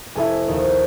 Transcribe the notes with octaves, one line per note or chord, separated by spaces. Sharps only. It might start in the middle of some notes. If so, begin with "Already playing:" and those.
F1 E4 A4 G#5
A#1 D#2 D#3